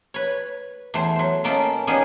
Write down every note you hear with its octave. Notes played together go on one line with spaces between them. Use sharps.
B4 C#5
E2 A3 C5
F#3 C5
B2 A#3 C#4 A4 G5 B5
D#3 G3 A#3 B3 C#4 G#4